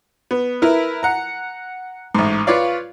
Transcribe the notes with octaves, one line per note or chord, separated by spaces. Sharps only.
B3
E4 A#4 B4
F#5 A#5
A1 G#2
F4 B4 C#5 D5 F5